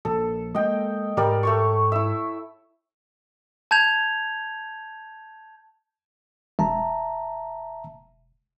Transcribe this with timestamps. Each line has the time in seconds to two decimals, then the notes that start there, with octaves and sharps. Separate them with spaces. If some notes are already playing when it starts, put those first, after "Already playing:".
0.05 A#1 A4
0.55 G#3 A#3 D#5 G5
1.17 G#2 G3 A#4 D5
1.43 A3 C#5 C#6
1.92 E4 E5
3.71 A5 G6 G#6 F7
6.59 E1 E5 A5 A#5